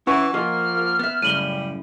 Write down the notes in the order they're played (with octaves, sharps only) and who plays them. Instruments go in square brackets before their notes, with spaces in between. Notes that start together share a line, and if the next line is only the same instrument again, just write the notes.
[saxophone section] E3 [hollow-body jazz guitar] C#4 C#5 [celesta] F#5 C#6
[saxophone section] F3 A#3 [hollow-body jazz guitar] F4 G#4 D#5 [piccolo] F6
[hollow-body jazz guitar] B3 E5
[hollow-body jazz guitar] F#2 A2 [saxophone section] C#3 G3 [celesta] D#7 F#7 G7